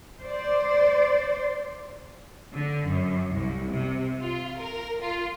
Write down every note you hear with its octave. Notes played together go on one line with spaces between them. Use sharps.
C5 D5
D3
F#2
C2
C3
F4
A#4
F4